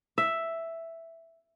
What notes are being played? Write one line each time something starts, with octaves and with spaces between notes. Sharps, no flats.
E5